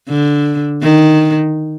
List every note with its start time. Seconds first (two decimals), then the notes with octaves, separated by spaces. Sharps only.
0.09 D3
0.82 D#3